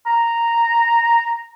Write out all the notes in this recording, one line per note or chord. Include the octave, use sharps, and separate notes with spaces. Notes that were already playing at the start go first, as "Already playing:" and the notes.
A#5